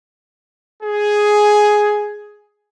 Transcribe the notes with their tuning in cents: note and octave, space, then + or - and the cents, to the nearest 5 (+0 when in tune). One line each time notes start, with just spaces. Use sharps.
G#4 +5